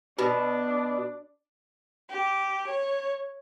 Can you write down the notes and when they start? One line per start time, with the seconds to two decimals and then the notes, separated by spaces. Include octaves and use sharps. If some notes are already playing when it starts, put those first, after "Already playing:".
0.19 B2 D4
2.09 G4
2.66 C#5